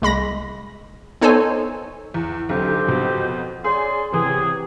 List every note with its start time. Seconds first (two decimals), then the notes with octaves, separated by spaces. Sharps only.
0.02 C2 G#3 B5 A#6
1.21 B3 D#4 A4 C5 C#5 G#5
2.14 E2
2.49 B1 D3 C4 G4
2.87 F2 B2
3.64 C#4 G#4 D5 C6
4.12 C3 E3 B3 C4 G#4